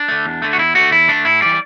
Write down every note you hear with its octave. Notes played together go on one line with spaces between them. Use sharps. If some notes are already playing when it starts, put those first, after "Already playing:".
Already playing: D4
D3 A3
E2
D3 A3
F#4
E2 E4
D3 A3 F#4
E2 E4
D3 A3 D4
A2 E4
E3 G3 D5